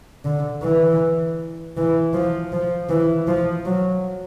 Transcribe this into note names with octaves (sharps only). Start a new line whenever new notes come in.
D3
E3
E3
F3
F3
E3
F3
F#3